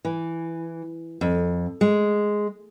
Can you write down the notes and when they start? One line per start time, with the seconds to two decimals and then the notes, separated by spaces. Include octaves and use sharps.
0.05 E3
1.21 F2
1.81 G#3